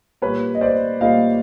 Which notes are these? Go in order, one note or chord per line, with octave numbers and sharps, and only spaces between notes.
A#2 G3 A#3 B4 C#5
D#5
C5 D5
A#2 G3 A#3 D#5 F5